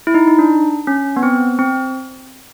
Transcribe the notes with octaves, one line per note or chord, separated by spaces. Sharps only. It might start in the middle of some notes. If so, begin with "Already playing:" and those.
E4
D#4
D#4
D4
C#4
B3
C4
C4